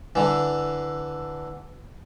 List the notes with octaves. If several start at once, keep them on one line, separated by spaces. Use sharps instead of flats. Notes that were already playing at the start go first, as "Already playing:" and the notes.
D3 E3